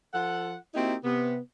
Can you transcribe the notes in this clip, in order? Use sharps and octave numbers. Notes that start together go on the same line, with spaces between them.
F3 F4 A4 F#5
A#3 C4 D#4 E4 F#4 G4
C3 B3